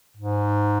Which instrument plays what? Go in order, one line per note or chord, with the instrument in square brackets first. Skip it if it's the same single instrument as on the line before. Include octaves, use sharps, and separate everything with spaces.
[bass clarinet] G#2